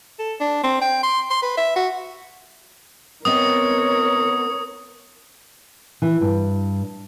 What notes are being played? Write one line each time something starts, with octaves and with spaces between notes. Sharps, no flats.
A4
D4
C4
G5
C6
C6
B4
E5
F#4
B3 C4 A#4 C#5 D#5 D#6
E3
G2